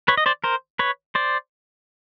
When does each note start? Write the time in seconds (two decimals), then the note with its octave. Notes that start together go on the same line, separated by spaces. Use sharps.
0.08 B4 C#5
0.17 D#5
0.26 C5 D5
0.44 A#4 C5
0.79 B4 C#5
1.15 C5 D5